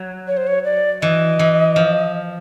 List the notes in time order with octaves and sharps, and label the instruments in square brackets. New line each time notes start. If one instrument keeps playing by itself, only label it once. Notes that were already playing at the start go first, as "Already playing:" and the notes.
Already playing: [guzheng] F#3
[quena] C#5
C5
C#5
D5
[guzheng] E3 [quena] D#5
[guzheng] E3
F3